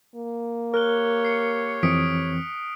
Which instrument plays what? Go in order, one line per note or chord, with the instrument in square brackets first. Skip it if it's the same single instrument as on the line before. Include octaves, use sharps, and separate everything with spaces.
[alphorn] A#3
[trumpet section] G4 C#5 [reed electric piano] A#4 [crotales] F6 F#6 G7
[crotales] C7 C#7
[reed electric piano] F2 E3 C4 [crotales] D#6 B6 D7